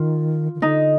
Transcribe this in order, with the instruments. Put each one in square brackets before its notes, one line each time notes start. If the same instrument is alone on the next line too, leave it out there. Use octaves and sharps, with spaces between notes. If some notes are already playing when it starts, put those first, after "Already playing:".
Already playing: [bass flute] D#3 [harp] F4
[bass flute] D#3
[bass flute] D3 [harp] D#4